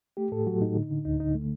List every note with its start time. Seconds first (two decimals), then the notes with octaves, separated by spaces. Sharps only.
0.17 A3 G4
0.32 A2 A4
0.47 F#3 F#4
0.61 A2 D#4
0.76 D3
0.91 D3
1.05 D2 D#4
1.20 D3 D#4
1.35 A3